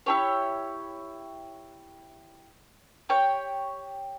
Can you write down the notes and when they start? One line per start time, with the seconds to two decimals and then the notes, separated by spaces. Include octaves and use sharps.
0.06 E4 G4 C#5
3.09 G4 C#5 G5